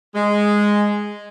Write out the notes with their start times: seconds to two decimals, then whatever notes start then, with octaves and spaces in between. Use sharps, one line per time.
0.15 G#3